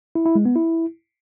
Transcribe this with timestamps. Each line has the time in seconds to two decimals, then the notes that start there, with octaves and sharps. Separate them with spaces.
0.15 E4
0.25 E4
0.35 G#3
0.45 B3
0.55 E4